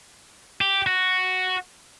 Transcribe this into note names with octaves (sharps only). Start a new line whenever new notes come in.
G4
F#4